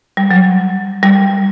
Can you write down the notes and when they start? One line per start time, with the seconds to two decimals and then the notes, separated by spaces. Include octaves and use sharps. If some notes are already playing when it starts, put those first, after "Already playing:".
0.17 G3
0.31 F#3
1.03 G3